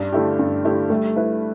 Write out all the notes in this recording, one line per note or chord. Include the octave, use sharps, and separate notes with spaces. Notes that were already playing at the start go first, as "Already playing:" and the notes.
Already playing: G2 D4
D3 A3 E4 G4
G2
D3 A3 E4 G4
G3 A3
E4 B4 E5